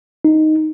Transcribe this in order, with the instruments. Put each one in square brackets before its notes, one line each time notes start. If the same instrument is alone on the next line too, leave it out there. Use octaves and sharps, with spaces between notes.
[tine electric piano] D#4